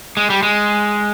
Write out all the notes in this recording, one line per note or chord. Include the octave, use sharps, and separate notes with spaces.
G#3
G3
G#3